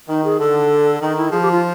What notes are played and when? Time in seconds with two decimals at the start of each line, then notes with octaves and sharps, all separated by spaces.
0.09 D#3 D#4
0.24 G#4
0.40 D3 A4
1.01 D#3 D#4
1.17 E4
1.31 F3 G#4
1.42 G4
1.51 F4